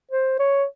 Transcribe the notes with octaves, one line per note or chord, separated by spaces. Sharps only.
C5
C#5